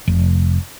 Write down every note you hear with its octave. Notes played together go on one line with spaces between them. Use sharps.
F1